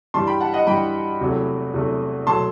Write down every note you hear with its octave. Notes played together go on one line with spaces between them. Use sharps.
G2 E3 G3 A5 C6
G5 B5
F#5 A5
D#5 F#5
G2 E3 G3 G5 B5
E2 C3 F#3 A3
E2 C3 F#3 A3
B2 F#3 A3 A5 C6